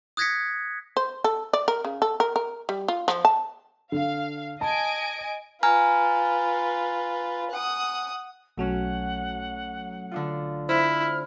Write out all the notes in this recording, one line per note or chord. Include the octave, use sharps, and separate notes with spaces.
D#6 F#6 G#6 A#6 B6 C#7
C5
A4
D5
A#4
C#3
A4
A#4
A#4
G3
F4
F3
A5
D3 F5
D#5 G#5 A5 D7
F4 B4 G#5 A#5 F6
F#5 D#6
B1 F#3 A3 C#4 F#5
D3 D4 F4
E4 C5 F6